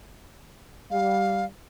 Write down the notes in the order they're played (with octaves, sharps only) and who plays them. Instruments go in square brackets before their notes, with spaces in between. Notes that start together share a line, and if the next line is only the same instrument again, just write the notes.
[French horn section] G3 [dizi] F5